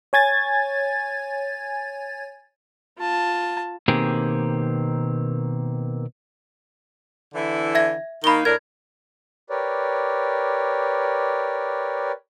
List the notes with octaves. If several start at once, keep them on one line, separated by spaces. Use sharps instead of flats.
C#5 G#5 G#6 A6
F4 A5
B2 D#3 A#3 C4 G4 G#4
D3 E3 E4
E5 G#6 A#6
D#3 A#3 D#4 B5 G7
A2 D4 A#4 G#6
G4 A#4 B4 C#5 D5